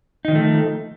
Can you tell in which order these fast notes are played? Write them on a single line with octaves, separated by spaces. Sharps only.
D#4 D#3 F3 A3